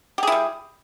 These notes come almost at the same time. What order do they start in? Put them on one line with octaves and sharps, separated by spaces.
G4 G#4 E4 G3